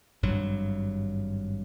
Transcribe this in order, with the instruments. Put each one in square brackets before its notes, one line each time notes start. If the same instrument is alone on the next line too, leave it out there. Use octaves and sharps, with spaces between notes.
[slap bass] G#1 G2 F#3